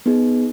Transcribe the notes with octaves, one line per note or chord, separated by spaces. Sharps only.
B3 D#4 G#4